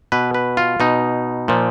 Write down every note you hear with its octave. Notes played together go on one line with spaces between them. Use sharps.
B2 B4
B4
F4
B2 D#4
A#2 F3